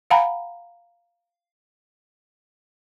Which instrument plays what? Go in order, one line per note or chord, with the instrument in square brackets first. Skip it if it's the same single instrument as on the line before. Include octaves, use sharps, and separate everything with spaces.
[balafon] F5 F#5 G#5 A#5 B5